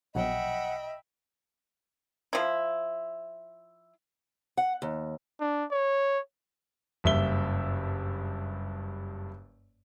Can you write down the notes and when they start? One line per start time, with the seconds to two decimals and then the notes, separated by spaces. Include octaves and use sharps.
0.15 A#1 B2 F#3 D#5 E5 F#5 G5 B5
2.33 F3 E4
4.57 F#5
4.82 D#2
5.40 D4
5.71 C#5
7.04 F#1 G2 E5 E6 G7